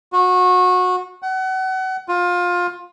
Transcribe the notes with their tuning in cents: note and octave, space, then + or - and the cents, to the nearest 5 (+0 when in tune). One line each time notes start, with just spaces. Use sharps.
F#4 -25
F#5 +30
F4 +20